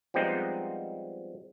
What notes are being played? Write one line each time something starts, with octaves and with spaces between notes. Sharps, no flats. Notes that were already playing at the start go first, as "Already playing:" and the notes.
F3 G3 G#3 B3 C4 D#4